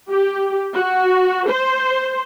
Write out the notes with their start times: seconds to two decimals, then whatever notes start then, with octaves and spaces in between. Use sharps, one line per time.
0.10 G4
0.76 F#4
1.50 C5